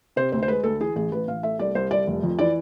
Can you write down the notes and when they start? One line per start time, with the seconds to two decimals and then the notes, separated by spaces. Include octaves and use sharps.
0.16 C3 C5
0.32 D2 C5
0.42 C5
0.48 G#3 B4
0.64 D2 A4
0.80 E3 G#4
0.95 A1 G#4
1.11 A1 B4
1.28 A1 F5
1.43 A3 E5
1.59 C2 D5
1.75 C2 C5
1.91 C2 D5
2.07 F1
2.23 F2
2.39 E3 D5